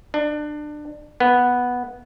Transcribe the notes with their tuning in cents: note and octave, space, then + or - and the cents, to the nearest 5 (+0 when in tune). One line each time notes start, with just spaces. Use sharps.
D4 +25
B3 -5